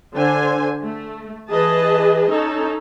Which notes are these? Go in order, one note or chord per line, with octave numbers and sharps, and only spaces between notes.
D3 C5 G#5
A3
E3 G#4 B4 D#5 A5
C#4 D#4 A4